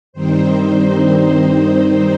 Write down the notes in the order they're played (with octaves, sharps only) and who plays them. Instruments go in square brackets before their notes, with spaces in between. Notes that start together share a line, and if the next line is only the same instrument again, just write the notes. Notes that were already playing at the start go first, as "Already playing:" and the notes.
[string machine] G2 D#3 G3 C4 D#4 C5